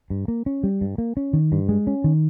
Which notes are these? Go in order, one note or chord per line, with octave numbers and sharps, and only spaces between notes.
G2
A#3
C#4
G3
G2
A#3
C#4
D#3
G2
G#3
C#4
D#3